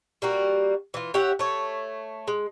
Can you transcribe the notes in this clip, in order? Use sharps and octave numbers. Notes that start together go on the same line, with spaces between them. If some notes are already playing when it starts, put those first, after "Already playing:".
G3 A#3 F#4
E3 F4
G4 C#5 E5 F#5
A3 C#5
G#3